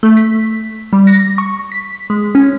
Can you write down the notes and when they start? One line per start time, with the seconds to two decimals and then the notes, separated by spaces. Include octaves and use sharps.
0.03 A3
0.17 B6
0.93 G3
1.07 A#6
1.38 C#6
1.72 B6
2.10 G#3
2.35 C#4